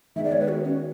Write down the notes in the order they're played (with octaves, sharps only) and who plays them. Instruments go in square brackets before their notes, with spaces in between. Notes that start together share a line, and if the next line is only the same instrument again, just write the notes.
[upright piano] D#3 G#3 B3 D#4 G#4 [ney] E5
[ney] D5
C#5
B4
F#4
C#4